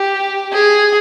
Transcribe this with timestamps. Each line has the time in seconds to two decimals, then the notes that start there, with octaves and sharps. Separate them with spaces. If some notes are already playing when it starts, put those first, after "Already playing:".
Already playing: G4
0.54 G#4